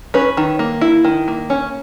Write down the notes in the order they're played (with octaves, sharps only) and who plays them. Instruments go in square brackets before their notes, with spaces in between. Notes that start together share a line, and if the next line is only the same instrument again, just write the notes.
[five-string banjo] C#4 B4
D#3
A#3
E4
D#3
A#3
C#4